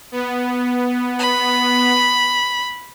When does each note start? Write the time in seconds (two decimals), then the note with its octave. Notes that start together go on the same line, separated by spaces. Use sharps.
0.12 B3
1.19 B5